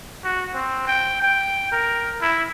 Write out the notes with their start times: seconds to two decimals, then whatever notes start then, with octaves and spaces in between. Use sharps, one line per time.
0.24 F#4
0.54 C4
0.87 G5
1.21 G5
1.72 A#4
2.22 E4